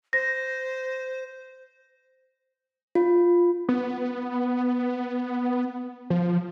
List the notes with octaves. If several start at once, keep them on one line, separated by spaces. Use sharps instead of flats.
C5 A#6
F4
B3
F3